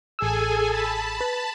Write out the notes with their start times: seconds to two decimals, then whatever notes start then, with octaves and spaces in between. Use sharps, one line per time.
0.19 A1 G#4 A4 G#5 E6
0.68 A5 B5
1.20 B4